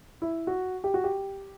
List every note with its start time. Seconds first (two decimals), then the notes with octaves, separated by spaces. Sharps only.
0.22 E4
0.47 F#4
0.84 G4
0.94 F#4
1.04 G4